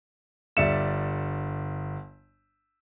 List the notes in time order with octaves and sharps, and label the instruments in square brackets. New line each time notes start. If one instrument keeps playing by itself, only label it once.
[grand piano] G1 G3 D5 E5 C#7 E7